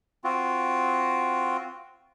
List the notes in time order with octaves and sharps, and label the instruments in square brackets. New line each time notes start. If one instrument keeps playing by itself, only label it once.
[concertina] C4 F4 F#4